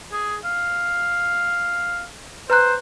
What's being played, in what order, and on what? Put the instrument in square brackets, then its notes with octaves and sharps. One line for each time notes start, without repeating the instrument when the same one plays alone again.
[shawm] G#4
F5
[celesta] B4 A#5 F#6 [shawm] C5